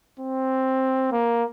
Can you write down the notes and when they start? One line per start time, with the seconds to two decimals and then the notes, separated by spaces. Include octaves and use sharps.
0.20 C4
1.12 A#3